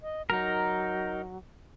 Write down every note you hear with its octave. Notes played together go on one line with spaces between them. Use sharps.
D#5
F#3 D#4 A#4